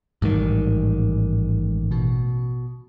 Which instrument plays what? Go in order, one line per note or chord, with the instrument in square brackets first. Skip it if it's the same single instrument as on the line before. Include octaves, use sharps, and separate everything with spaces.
[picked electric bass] A1 D#3 [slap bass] G#2 G3
[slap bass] B2